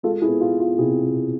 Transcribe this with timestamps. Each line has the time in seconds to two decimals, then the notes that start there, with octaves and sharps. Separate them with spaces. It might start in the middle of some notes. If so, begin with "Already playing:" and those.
0.03 G#3 F4 A4
0.22 E4 G#4
0.28 B3
0.41 F4
0.53 B3
0.60 F4
0.78 C3 E4 G#4
1.03 C3